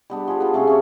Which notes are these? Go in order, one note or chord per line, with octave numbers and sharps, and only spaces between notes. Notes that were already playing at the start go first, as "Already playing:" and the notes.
G3 B3 D4
F3 G#4 B4
B3 F4
C3 A3 C#4 G#4
C#4 A4 C#5